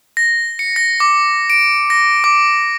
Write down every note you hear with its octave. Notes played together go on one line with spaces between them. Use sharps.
A#6
C#7
A#6
D6
D7
A#6
D6